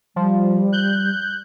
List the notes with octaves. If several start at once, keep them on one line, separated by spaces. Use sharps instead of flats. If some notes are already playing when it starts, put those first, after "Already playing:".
F3 G3
F#6 G6